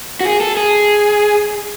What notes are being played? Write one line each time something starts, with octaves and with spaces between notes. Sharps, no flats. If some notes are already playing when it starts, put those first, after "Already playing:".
F#4
G#4
A4
G#4